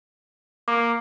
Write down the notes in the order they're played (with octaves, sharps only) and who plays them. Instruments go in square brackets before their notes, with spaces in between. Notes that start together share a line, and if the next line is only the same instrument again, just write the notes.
[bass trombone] A#3 [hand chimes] D6